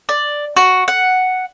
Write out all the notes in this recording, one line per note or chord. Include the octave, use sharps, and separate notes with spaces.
D5
F#4
F#5